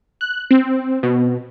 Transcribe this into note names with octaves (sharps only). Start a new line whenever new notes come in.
F#6
C4
B2